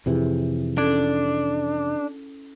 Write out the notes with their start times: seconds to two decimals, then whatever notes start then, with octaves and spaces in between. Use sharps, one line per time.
0.06 F2 C3 E3 E4 G#4
0.78 C#4 D4 A4 G#6